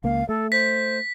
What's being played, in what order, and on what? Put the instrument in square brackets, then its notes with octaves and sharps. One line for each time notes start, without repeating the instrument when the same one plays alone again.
[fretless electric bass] C#2 A#3 [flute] F5
[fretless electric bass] A3 [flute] A4
[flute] C5 [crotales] B6